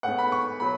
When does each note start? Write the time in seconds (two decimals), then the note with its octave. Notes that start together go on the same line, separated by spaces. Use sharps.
0.03 A2 G#3 B3 F#5
0.18 B5
0.32 C#6
0.60 B2 F#3 B5